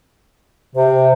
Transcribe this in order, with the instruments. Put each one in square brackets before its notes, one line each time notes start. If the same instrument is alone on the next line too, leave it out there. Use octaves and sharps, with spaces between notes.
[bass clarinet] C3 [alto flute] C5